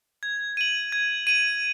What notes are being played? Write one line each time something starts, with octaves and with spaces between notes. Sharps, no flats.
G#6
D#7 F#7
G#6
D#7 F#7